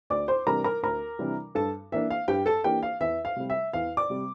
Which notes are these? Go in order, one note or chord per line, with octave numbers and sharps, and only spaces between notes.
D2 D5 D6
C5 C6
C3 E3 G3 D4 A#4 A#5
A#4 A#5
D2 A#4 A#5
C3 E3 G3 D4
G2 A4 A5
E3 A#3 D4 E5
F5
G2 G4 G5
A4 A5
E3 A#3 D4 G4 G5
F5
E2 E5
F5
C3 G3
E5
E2 F5
D5 D6
C3 G3